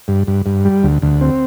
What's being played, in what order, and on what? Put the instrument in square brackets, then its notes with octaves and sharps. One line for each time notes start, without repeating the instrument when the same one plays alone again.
[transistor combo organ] G2
G2
G2
G3
D2
D2
C4